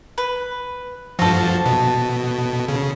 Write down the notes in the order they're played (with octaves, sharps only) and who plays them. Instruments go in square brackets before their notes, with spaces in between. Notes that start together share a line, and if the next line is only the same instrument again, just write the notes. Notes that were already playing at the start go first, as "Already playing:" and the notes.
[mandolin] B4
[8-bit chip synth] G2 F3 [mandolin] F#4 A4
[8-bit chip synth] B2
C#3